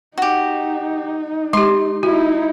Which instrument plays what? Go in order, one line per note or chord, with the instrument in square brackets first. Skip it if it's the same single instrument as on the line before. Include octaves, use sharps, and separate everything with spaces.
[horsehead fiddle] D#4 [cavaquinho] F#4 G4
[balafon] G#3 G4 [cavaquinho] C6
[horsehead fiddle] D#4 E4 [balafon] F#4